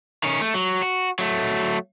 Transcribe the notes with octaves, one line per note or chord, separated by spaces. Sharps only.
D#3 C#4
A3
F#3
F#4
F#3 A3